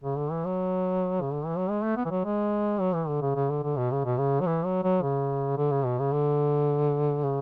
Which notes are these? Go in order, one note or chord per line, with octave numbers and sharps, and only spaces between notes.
C#3
D3
E3
F#3
C#3
D3
E3
F#3
G#3
A3
B3
E3
F#3
G#3
F#3
E3
D3
C#3
C#3
D3
D3
B2
C#3
B2
C#3
F#3
E3
F#3
F#3
C#3
D3
C#3
B2
C#3
D3
C#3